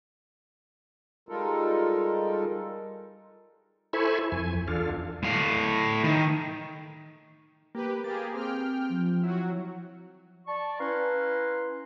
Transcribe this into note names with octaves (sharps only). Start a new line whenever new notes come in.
G3 G#3 D#4 F4 A4 A#4
E4 A4 C5 G#5 B5 C#6
F2 G#5
E2 D4 F4 A4 F5
A2 F5
D#3
A#3 G4 B4
A#3 G4 G#4 A6
C4 G5 F6
F3
F#3 E4 F#4
D5 A5 C#6
C#4 E4 B4 F5 A#5 C6